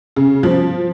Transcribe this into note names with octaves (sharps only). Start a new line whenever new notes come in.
C#3
F3